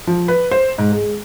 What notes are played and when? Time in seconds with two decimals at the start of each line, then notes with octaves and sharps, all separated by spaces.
0.07 F3
0.28 B4
0.51 C5
0.78 G#2
0.92 G#3